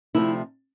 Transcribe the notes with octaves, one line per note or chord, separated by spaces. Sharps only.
D2 C3 F3 A3 C4 E4